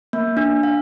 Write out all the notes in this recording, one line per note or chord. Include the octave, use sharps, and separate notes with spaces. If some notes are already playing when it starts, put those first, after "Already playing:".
A#3
D4
F5